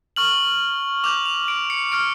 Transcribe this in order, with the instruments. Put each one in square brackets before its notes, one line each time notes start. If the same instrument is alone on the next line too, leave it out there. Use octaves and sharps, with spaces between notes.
[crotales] C#6 F6 F#7
D6 G6 F7
F7
D7
C#7
C#6 F6 D7